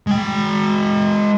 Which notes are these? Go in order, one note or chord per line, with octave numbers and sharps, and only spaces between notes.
G#3 G5